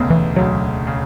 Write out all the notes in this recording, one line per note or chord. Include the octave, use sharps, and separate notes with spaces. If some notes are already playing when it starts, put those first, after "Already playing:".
Already playing: E1 D2 C#3 B3
E3
E1 D2 C#3 F#3
C#3